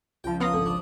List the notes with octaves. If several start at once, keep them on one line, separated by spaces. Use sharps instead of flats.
C#2 F3 G5
B3 F5 A#5 C6 D#6
G#1 D3
D4